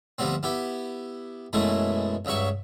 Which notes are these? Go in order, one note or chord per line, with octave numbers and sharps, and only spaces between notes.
D2 F3 G3 B3 C4
B3 E4 G4
F#2 B2 E3 G#3 A3 E4
C#2 G2 F#3 E5 C#6